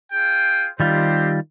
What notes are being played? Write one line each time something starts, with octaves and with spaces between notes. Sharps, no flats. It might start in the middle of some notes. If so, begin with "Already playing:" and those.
F4 G#4 G5
D#3 G3 C4 F4 G4 C5